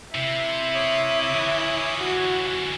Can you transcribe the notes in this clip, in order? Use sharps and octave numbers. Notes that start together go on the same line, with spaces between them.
C3 E4
C#5 D6 D#6
D3 E3
F#4